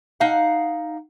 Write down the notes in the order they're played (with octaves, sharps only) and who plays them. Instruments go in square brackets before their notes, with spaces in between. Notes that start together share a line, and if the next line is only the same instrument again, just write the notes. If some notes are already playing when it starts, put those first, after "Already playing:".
[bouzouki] D#4 F5 F#5